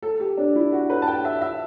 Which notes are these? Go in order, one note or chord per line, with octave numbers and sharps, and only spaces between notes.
A4
G4
D4
E4
F#4
B4
A5
G5
E5
E5